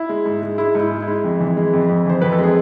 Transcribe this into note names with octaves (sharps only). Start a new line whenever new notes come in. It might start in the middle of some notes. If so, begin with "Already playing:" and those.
Already playing: E4
G#3
G#2
G#3
G#3 E4
G#2
E4
G#3
E4
G#3
F2
E3
G#3
F2
F2
E3 C5
F2 B4
A4
G#3 G#4